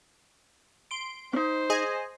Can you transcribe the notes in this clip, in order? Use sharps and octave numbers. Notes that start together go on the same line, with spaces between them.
C6 D7
C#4 D#4 C5
G#4 D#5 G#5